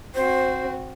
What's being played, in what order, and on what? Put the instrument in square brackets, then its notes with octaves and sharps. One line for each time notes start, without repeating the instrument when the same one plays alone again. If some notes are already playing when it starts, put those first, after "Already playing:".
[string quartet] C4 F#4 [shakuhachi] C5